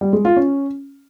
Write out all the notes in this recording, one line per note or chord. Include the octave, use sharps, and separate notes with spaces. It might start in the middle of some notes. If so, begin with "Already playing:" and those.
G3
G#3
F4
C#4